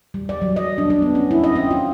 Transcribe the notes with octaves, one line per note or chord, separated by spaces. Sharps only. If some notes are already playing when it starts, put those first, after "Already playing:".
G3
D5
F#3
D#5
D4
D4
B3
C#4
E4
D#5
C4
F4